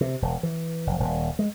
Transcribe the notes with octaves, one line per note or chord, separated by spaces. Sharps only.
C3
E1
E3
F1
D#1
G#3